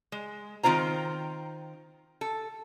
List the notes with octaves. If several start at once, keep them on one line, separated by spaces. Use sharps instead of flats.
G#3
D#3 C4 F4 C5 A#5
A4